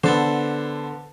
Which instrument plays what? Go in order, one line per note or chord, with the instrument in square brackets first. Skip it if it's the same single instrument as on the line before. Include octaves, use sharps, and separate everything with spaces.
[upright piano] D3 [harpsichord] B3 A4 C5